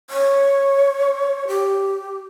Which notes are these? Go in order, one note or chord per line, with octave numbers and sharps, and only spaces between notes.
C#5
G4